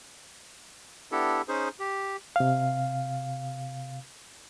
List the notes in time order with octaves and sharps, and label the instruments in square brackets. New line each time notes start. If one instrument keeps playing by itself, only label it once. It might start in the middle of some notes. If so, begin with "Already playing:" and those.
[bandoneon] B3 D4 E4 G4 A4
C#4 D#4 G#4 C5
G4
[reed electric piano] C3 F5